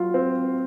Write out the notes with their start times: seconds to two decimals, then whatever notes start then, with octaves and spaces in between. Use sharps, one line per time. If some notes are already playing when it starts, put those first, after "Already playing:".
Already playing: F#3 F4
0.14 C4